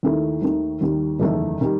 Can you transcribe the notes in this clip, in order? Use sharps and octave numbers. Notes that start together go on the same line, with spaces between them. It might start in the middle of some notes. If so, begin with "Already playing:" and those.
D#2 D#3 A3 E4 A4
D#2 D#3 A3
D#2 D#3 G3
F#1 E2 D#3 A3
D#3 G3